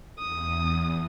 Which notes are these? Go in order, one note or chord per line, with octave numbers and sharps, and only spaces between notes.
E2 D#6